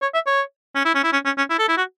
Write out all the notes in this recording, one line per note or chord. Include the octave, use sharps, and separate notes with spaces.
C#5
E5
C#5
C#4
E4
C#4
E4
C#4
C#4
C#4
E4
A4
E4
F#4